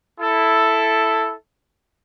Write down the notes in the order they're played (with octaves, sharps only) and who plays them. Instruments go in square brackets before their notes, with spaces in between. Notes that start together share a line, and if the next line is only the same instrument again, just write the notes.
[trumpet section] E4 A4